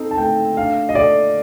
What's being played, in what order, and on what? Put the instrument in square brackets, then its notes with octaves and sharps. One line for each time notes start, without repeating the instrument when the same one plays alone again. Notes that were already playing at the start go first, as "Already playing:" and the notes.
Already playing: [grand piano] C4 D#4 A4
[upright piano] A5
[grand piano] A3 [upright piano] G5
[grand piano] D4 [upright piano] F5
[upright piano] D#5
[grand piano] A4 [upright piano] D5